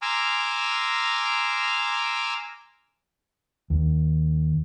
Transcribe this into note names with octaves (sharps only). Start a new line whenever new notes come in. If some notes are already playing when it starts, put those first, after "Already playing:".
G#5 A#5 C6 D6 E6 F6
D#2